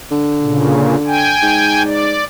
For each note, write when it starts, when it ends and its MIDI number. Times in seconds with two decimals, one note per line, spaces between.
0.11 1.36 50
0.41 0.95 46
0.41 0.95 49
1.07 1.82 79
1.07 1.82 80
1.42 2.21 44
1.85 2.25 74